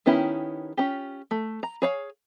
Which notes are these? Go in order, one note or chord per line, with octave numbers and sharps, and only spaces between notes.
D#3 B3 C#4 E4 G4
C#4 F4 G4
A3
A#5
G#4 C#5 F5